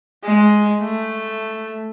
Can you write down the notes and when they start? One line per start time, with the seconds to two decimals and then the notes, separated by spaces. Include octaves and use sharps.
0.24 G#3
0.81 A3